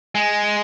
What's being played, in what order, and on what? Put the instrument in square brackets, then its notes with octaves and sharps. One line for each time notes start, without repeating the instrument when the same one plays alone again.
[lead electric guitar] G#3